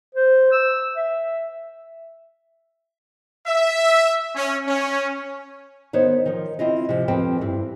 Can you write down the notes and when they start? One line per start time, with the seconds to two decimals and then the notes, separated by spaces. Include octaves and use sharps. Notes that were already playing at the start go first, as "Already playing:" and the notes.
0.15 C5
0.52 E6
0.96 E5
3.47 E5
4.36 C#4
4.67 C#4
5.93 D#3 B3 C5 C#5
6.26 D#3 F3
6.59 C4 E4 F4 D#5
6.89 C3 F3
7.08 F2 F3 C4 B4 G5
7.41 G2 C4 E4